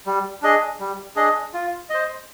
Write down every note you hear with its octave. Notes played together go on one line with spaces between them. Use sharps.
G3
D4 G#4 D#5
G3
D4 G#4 D#5
F4
C5 D#5